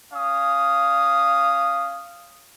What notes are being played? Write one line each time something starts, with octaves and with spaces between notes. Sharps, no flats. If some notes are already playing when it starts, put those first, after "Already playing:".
C#4 F5 D#6